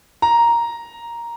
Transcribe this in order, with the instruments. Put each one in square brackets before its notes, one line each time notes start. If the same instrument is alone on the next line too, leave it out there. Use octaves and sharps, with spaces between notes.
[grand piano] A#5